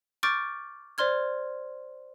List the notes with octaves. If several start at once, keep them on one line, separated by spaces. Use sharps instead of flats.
C#6 D6 F6 G6 A6 D7
C5 D5 C6 F6 G#6